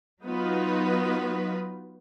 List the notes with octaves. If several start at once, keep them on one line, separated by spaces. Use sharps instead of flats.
F#3 B3 D#4 F4 F#4 B4